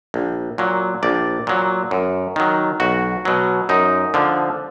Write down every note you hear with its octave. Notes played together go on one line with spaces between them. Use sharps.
A#1
A#2 F#3
A#1 D5
A#2 F#3
F#2
D#3 F#3
B1 F#4
B2 F#3
F#2 D#4
D3 F3